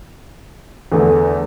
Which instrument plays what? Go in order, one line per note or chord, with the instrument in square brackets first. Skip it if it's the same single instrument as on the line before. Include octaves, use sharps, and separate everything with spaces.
[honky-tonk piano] E2 D3 A3